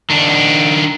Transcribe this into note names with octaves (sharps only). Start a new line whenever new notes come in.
D#3 D4